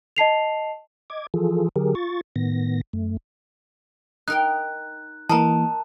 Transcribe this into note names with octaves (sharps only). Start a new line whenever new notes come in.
D#5 A5 C7 F7
D#5 D6 G#6
E3 F3 F4 G#4 A4
D3 F#3 G4 G#4 A#4
F4 C#6 A6
A2 D#3 B3 A#6
F#2 A3
D#4 A#4 G5 F#6
E3 A#3 A#4 D#5 A5 A#5